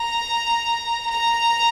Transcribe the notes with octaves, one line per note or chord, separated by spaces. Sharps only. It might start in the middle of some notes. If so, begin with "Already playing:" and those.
Already playing: A#5
A#5